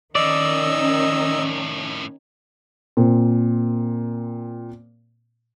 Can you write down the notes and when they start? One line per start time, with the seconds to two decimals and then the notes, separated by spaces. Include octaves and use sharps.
0.15 F2 A2 D#3 C#4 D5 D#5 E6
2.97 A#2 C4